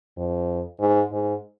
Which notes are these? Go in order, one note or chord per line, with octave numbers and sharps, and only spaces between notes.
F2
G#2
G#2